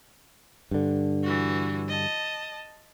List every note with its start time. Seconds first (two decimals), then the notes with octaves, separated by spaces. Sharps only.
0.71 G2 D3
1.23 E3 F#4
1.88 D#5 A5